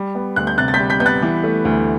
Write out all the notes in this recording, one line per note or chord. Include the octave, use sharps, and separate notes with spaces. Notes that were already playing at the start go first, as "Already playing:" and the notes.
Already playing: G3
B3
D2 F#6
G6
C3 F#6 A6
A6
G6 B6
G3
G6 B6
B3 G6
F#6 A6
E3
A3
D2